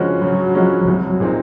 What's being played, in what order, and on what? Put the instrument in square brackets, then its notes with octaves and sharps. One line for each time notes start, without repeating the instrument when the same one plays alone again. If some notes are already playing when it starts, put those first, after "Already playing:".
Already playing: [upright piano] C#3 F3 G#3 C#4 F#4
[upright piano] C#3 [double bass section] F#3
[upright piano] F3 G#3 C#4 F#4
[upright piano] C2 [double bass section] F#3
[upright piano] A#2 G#3 C4 D#4